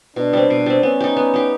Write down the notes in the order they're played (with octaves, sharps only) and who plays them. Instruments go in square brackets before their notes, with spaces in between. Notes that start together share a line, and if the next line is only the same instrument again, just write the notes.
[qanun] B2 [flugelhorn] D4
[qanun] G3 C4
B2
G3 C4
[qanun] B3 [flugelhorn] C#4
[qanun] D#4 G4
B3
D#4 G4